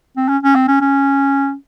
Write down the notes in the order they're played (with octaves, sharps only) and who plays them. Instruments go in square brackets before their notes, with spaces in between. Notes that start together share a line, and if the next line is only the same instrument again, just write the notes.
[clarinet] C4
C#4
C#4
C4
C#4
C#4